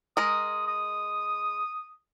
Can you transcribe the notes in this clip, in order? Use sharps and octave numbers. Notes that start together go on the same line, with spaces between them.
G#3 A#4 D#5 D#6
D#6